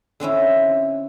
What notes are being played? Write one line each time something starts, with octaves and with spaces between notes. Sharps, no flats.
D3 C4 C#4 E4